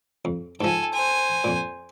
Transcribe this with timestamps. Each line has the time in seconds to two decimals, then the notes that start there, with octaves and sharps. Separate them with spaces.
0.25 F2
0.61 G#2 F3 A4 G#5
0.93 C5 G#5
1.44 F2 A#2